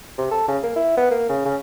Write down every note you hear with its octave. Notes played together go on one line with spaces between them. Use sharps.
C3
A4
C#3
A#3
E4
B3
A#3
C#3
C#3